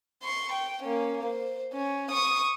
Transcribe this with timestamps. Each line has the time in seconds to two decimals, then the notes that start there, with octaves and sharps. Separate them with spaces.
0.23 C6 C#6
0.52 G5
0.83 A#3 C#4
1.25 C5
1.73 C#4
2.11 C#6 D#6